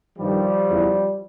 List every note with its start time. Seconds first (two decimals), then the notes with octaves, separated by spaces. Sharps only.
0.18 G2 D#3 F3 G3
0.68 E2 C#3 E3